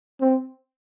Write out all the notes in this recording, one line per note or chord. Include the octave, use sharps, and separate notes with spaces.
C4